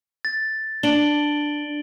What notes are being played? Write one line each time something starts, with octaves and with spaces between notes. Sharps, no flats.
A6
D4 D7 F#7 G7